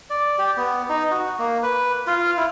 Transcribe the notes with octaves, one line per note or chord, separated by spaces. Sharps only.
D5
G4
B3
D#4
F#4
A#3
B4
F4
E4